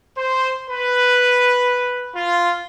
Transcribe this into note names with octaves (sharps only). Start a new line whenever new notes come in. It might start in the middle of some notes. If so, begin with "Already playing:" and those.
C5
B4
F4